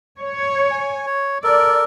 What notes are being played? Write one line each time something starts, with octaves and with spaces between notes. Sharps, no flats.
C#5
G#5
C#5
A4 A#4 D5